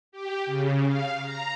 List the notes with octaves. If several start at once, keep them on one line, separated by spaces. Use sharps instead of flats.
G4
C#3
F5
A#5